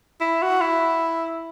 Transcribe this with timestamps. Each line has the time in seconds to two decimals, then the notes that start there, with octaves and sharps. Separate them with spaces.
0.21 E4
0.42 F#4
0.61 E4